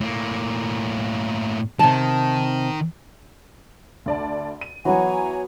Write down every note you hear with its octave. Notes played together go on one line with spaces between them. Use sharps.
A2 A#3
C3 D#3 A5
D2 D5 A5
D#7
E3 F#3 B3 F#4 C#5 G#5 A#5